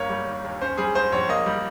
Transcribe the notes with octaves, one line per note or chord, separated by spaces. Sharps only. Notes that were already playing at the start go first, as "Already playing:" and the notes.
Already playing: G1 A#3 C#5
G3
D#3
D#2
C#4 C5
G3 G#4
G#2 C5
A#1 C#5
A#3 D#5
G3